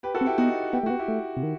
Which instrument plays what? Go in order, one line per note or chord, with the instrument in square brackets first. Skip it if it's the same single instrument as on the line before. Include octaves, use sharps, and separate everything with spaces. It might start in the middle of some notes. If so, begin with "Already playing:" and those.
[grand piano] G4 B4
F#4 A4
[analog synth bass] C4
[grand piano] E4 G4
[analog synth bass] B3 [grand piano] D#4 F#4
[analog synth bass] B3 [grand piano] G4
[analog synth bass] A3
[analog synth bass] B3 [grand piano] F#4
[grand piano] E4 G4
[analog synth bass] A3
C3
D#3